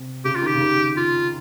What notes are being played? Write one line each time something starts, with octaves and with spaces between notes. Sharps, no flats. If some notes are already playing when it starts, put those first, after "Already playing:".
Already playing: C3
C#3 G4
F4
D#3 G4
C#3
D#3
F4